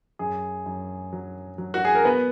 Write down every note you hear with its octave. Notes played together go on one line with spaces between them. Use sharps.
F#2 G#4
F#2
F#3
F#3
F#4
G#4
A#4
B3 B4